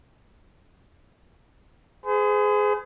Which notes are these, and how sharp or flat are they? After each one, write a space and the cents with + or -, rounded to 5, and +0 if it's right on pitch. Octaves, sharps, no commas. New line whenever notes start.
G#4 +5 C5 -45